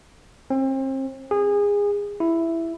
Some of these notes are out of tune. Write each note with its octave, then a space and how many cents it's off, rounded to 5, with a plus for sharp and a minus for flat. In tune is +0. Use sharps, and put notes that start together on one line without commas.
C4 +35
G#4 -25
E4 +5